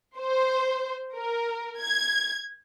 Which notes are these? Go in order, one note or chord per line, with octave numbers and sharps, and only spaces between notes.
C5
A#4
G#6